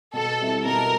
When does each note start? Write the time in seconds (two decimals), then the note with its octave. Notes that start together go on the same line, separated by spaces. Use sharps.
0.13 B2 A4
0.40 G3 C4 E4
0.65 B2 A#4